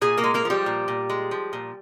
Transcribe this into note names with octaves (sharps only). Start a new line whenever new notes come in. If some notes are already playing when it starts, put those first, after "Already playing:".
A#2 G#4 G#5
A#3 A#4
G#3
A#3 A#4
F3 G3 G4
A#2
A#2
G#3
F3
A#2